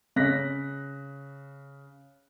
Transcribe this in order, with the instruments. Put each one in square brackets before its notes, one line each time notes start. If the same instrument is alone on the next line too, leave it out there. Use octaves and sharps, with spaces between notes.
[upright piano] C#3 F#6 A#6 B6